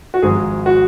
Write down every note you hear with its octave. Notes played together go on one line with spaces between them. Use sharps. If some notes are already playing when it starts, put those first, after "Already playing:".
F#4
G#1 G#2 F3 G#3 G#4
F#4